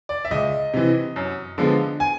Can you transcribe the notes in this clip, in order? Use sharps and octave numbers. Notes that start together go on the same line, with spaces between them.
D5
E5
C#2 D#5
C3 E3
F#2
D3 F3 G#3 B3
G#5